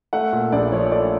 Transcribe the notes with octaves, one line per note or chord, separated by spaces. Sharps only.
A3 F#5
A#2
A#1 D5
F3 C#5
A3 D5